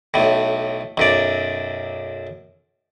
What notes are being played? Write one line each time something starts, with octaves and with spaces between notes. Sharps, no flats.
B1 A2
B1 F#2 D5